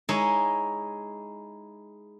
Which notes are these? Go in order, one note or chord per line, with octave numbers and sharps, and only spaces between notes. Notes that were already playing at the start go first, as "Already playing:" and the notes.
G#3 D#4 E4 C#5 D#5